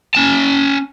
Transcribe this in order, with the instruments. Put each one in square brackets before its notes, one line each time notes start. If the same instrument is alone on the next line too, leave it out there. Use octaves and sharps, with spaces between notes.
[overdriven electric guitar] C#4 A5